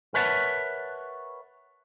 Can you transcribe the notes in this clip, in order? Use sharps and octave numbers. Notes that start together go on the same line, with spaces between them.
A#4 B4 C#5 E5 F#5 A5